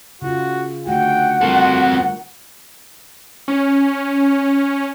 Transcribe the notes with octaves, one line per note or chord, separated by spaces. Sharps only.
C#3 F4 F#4
D3 A3 F#4 F#5 G5
G3 C4 F4 F#4 A4 A#4
C#4